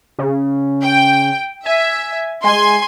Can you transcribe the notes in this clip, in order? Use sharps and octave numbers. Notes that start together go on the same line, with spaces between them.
C#3
G5
E5 G#5
G#3 G#5 C6